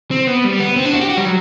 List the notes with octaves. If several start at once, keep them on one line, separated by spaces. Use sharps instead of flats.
C4
B3
G3
B3
C4
D4
F#4
G4
F#4
G3
F#3